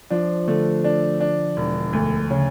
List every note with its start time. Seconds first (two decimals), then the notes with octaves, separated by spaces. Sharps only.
0.10 F3 D4
0.47 D3 A3
0.84 D4
1.21 D4
1.57 E1
1.93 D2
2.30 C#3